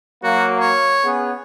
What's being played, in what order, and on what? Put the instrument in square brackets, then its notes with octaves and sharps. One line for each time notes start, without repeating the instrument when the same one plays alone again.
[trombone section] F#3 A#3 [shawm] F#4
[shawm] C#5
[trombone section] B3 C#4 G#4